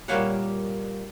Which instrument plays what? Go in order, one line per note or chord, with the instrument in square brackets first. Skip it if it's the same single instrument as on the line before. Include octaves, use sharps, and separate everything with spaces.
[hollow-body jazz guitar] A#2 G3 A#3 C#5 F5 F#5